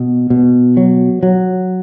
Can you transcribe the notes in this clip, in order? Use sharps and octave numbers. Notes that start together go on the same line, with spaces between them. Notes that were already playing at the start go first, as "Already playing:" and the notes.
Already playing: B2
B2
F#3
F#3